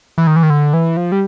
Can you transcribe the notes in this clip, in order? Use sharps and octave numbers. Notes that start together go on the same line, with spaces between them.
E3
D#3
E3
D#3
D3
E3
F3
G3